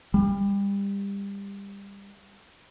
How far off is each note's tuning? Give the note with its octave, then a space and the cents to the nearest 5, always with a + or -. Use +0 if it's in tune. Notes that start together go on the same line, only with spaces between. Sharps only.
G3 +25